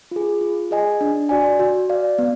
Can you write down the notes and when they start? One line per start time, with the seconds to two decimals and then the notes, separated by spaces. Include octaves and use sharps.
0.11 F4 G#4
0.41 F4
0.71 G#4 D#5 G#5
1.01 D4
1.29 F#4 D5 G#5
1.59 F#4
1.89 D5 F5
2.18 B3